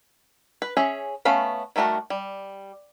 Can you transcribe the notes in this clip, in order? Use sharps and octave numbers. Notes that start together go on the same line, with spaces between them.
B4
C#4 G#4 C#5 E5
A3 B3 C#4 F5 B5
D#3 G3 A3 F#4 A#4
G3